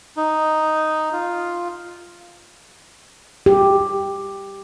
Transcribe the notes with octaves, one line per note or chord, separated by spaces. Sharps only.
D#4
F4
G4